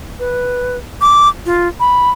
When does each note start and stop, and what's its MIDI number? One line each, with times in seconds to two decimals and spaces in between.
0.19 0.77 71
1.01 1.29 86
1.46 1.68 65
1.80 2.10 83